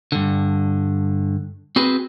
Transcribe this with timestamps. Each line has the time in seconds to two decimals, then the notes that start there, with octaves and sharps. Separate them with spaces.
0.12 G2 D3
1.76 C4 F#4 G#4 B4